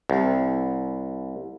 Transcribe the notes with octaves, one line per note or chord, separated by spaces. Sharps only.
C2